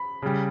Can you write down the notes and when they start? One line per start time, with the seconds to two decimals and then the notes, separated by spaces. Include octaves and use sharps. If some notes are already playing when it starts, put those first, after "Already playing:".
Already playing: B5
0.22 C#3 G3